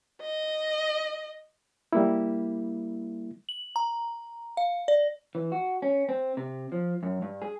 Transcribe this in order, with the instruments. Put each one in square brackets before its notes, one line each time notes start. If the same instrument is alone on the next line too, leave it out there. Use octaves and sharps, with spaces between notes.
[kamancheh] D#5
[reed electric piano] G3 A#3 E4
[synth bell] F#7
A#5
F5
D5
[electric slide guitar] E3
F#4
C#4
C4
C3
F3
F#2
G2
G#4